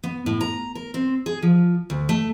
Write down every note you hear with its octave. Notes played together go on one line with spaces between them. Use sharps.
B3
A2
A#5
A#4
C4
G#4
F3
D2
A3